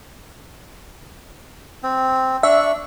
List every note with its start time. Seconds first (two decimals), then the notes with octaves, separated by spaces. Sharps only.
1.83 C4
2.43 D4 E5 C#6